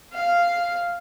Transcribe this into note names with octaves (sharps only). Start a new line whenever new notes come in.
F5